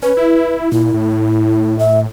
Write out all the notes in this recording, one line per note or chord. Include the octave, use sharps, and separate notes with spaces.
C#4 B4
E4
A#2 E4
A2
E5